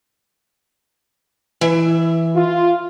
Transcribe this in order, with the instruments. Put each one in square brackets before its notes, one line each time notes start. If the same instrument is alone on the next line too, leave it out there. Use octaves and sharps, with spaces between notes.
[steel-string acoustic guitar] E3 E5
[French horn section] F4